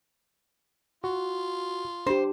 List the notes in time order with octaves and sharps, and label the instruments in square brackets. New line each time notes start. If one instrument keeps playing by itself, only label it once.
[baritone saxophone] F4 [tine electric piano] F#4
[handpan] D4 G4 [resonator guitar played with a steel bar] C5